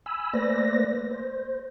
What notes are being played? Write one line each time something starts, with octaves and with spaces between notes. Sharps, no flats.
G#5 B5 E6
A3 A#3 B4 C5 D5 A#6
C5